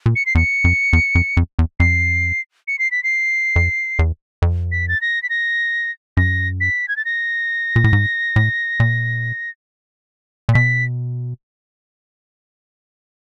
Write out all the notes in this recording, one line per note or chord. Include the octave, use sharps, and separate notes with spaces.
A#2
C#7
C7
E2 C#7
F2
E2
F2
F2
E2
F2 C7
C#7
C7
B6
C7
F2
E2
F2
B6
A6
A#6
B6
A#6
F#2 A#6
B6
G#6
A6
A#6
A#2
A2
G#2
A2
A#2
A#2
B2 B6